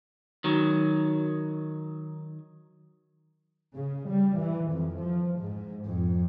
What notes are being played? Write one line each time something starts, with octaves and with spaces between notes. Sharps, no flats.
D#3 F#3
C#3
G3
E3
F2
F3
G#2
F2